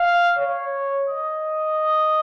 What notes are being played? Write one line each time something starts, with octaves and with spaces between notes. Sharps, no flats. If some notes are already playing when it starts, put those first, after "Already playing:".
Already playing: F5
C#5
D#5